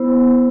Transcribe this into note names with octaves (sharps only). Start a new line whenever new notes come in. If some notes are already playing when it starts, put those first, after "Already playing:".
Already playing: B3 E4 C5